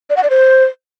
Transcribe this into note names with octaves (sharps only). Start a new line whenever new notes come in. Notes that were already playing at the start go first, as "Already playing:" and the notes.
D5
F#5
D5
C5